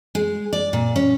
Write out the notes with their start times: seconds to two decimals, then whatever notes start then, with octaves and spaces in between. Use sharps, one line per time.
0.15 G#3
0.53 D5
0.73 A#2
0.96 C#4